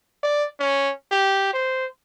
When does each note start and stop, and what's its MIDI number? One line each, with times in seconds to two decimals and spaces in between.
0.23 0.47 74
0.59 0.92 61
1.11 1.49 67
1.53 1.86 72